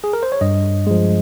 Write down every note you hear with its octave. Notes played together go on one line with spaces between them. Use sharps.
G#4
A#4
C5
C#5
G2 D#5
F3 G#3